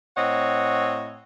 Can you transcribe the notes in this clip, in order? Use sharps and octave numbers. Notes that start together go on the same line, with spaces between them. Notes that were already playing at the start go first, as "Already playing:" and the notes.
A2 C4 C#5 D#5 F#5